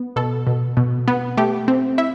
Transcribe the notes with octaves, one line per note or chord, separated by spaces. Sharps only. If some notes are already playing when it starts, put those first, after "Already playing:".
Already playing: B3
B2 A4
B2
B2
B3
A3 G4
C4
E4 E5